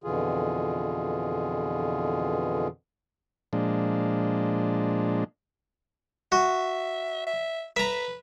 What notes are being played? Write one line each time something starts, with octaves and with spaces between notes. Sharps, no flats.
F2 B2 D3 E3 F4 G#4
A#2 F3 G#3 D4
F#4 E5
E5
B4 E5 A#5